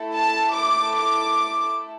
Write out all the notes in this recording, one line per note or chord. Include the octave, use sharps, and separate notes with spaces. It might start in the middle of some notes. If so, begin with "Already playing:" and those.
Already playing: A3 E4 A4
A5
D6
D6